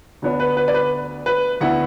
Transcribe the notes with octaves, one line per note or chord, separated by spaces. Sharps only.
D2 D3 B3 D4
B4
B4
D5
B4
B4
D2 D3 B3 E4 F#5